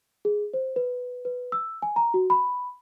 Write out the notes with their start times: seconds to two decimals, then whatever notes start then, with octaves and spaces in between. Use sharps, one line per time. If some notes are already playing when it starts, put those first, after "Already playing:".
0.25 G#4
0.54 C5
0.76 B4
1.25 B4
1.52 E6
1.82 G#5
1.96 A#5
2.14 F#4
2.30 B5